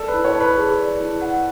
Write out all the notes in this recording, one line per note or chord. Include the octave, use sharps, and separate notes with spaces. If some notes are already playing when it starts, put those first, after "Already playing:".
Already playing: A4 D5
B4
E4
C#5
A5
B4
G#4
D5
E4
F#5